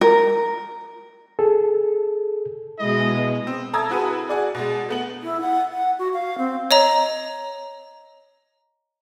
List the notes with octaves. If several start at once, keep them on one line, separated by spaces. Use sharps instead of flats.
A#4
G#4 A4
B2 G#3 E4 D#5
C4
A4 A5 A#5 D#6 E6 G#6
C4 E4 F#4 G#4 B4
F#4 G#4 D5
B2 G#3
A3 B3 F#7
E4
F#5
F#5
F#4
F5
C4
C#5 D#5 A#5